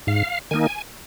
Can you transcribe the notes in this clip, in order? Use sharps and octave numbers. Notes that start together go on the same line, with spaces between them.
G#2 F5
D#3 A#3 D#4 G#5